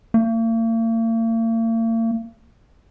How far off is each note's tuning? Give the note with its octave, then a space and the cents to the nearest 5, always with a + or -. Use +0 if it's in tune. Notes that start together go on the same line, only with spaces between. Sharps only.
A#3 -45